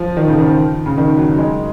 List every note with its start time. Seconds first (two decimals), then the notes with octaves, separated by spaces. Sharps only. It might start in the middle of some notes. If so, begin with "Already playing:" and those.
Already playing: F3
0.17 D#3
0.28 C#3
0.38 D#3
0.86 C#3
0.98 D#3
1.17 F#3
1.38 G#3